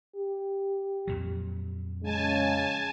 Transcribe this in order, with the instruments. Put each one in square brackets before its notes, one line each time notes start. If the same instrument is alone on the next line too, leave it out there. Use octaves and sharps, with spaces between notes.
[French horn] G4
[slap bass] F2 A#2 F#3
[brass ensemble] C#3 [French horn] G#3 [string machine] G#5 A5